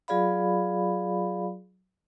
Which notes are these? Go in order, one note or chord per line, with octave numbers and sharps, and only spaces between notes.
F#3 F4 G#4 D5 F5 B5